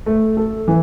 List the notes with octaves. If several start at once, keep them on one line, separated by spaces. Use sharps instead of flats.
A3
A4
E3